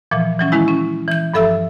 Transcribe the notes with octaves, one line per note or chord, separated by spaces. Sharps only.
A#2 E3 F3
E3 F#3 C#4
D#3 G#3 C#4 E4
C#4
E3 G6
G2 F3 A4 E5 E6